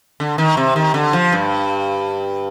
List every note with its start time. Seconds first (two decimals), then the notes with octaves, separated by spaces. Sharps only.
0.20 D3
0.38 D#3
0.57 C3
0.76 D#3
0.94 D3
1.13 F3
1.32 G2